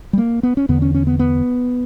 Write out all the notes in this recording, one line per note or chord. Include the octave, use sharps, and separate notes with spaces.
G3
A#3
B3
C#4
E2 D3 B3
C#4
C#4
B3
B3